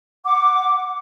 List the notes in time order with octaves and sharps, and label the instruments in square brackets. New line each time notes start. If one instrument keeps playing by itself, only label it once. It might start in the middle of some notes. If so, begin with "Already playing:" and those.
[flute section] F#5 D6